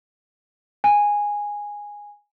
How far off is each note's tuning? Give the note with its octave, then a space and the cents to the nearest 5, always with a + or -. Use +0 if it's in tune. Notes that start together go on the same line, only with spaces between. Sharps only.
G#5 -10